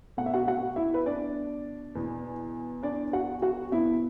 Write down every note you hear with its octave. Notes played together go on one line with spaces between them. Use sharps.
B2 A3 F#5
E5
F#4 F#5
F#4 F#5
E4 E5
B4
D4 D5
E2 B2 B3
D4 D5
F#4 F#5
F#4 F#5
B2 B3 E4 E5